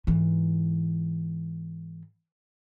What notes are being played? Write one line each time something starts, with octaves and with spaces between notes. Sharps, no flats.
G#2 E3